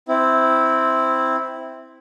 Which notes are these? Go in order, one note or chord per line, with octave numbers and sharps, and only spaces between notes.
C4 E4